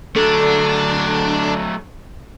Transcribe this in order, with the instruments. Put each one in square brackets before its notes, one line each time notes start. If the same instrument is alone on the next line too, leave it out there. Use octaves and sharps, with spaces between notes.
[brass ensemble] D3 [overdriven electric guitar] F#3 A3 [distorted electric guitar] D4 [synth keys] A4